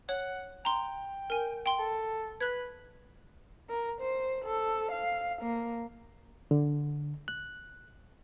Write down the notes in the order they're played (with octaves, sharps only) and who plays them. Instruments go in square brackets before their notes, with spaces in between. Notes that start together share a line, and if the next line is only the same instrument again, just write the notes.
[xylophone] C#5 [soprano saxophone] F#5
[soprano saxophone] G5 [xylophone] A#5 C6
[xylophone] A#4 G#5
G5 C6
[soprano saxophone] A4
[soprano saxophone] B4 [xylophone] F#6 G#6
[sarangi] A#4
C5
A4
F5
A#3
[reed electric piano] D3
F#6